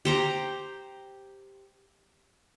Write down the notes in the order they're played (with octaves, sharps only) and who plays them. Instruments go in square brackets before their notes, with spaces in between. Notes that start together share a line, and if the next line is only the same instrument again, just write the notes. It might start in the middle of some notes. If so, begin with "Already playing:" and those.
[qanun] G4 C5 A#5